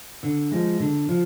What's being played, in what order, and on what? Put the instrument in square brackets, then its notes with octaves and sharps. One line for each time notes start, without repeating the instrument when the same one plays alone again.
[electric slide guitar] D3
F3 G#3
D3
F3